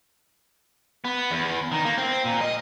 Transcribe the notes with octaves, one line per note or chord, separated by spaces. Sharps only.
B3
E2
D#3
A#3
C4
A#2
D#5